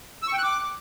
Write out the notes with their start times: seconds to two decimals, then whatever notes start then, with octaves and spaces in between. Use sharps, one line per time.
0.23 E6
0.28 C#6
0.33 G5
0.38 F#6
0.43 D6